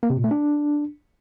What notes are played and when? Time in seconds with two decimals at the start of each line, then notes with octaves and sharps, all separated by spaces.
0.03 A#3
0.10 C3
0.17 A#2
0.24 A3
0.31 D4